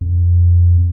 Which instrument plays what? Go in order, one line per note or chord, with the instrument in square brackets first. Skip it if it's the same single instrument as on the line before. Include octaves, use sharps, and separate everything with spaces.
[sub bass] F2